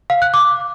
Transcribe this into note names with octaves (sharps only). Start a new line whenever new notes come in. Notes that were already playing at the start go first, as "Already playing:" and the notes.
F5
F#6
D6